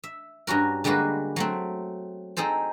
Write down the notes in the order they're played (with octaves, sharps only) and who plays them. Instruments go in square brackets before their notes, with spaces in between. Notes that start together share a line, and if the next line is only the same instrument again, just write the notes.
[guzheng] E5
G2 C#4 F#4 A#4
D3 G3 G#3 A#3 F#4 B4
F#3 A3 C4
C4 D#4 G#4 A4 C5